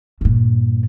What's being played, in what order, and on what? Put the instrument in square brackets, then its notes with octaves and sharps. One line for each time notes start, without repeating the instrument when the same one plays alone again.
[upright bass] G2 A#2